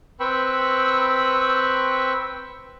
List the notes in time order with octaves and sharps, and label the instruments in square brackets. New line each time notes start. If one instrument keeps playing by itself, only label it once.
[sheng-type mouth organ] C4 B4 G5 B5 C#6 E6